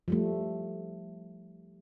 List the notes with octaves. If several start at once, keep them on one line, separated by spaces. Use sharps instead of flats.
F3 G3 A3